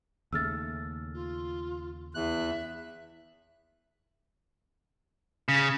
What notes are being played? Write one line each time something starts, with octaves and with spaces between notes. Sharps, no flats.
D#2 C#3 A3 E6 F6 A6
F4
E2 E5 F#6
C#3